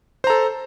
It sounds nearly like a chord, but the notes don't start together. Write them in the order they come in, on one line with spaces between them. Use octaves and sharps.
C5 A#5 A4